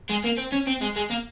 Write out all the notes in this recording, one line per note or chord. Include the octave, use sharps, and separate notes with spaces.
G#3
A#3
C4
C#4
C4
G#3
G#3
A#3